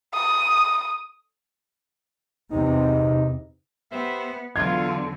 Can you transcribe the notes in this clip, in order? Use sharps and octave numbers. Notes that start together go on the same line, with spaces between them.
D#6
E2 C3 D#4
B3 G4 C5 E5
E2 D3 F#3 F4 G#6